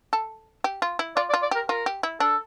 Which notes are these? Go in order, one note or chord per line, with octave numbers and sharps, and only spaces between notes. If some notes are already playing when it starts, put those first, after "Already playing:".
A4
G4
F4
E4
F4 D5
D5
F4
D5
G4 A#4
F4 A#4
G4
E4
D4 A4